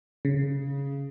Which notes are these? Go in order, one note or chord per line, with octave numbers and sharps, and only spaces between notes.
C#3